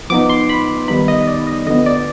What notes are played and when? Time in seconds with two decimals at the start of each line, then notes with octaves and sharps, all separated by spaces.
0.10 F3 B3 D#4 D6
0.30 C6
0.49 B5
0.88 D#3 G3 B3 D#4 B5
1.08 D#5
1.23 D#5
1.27 D5
1.47 D#5
1.66 D3 F3 B3 D#5
1.86 D5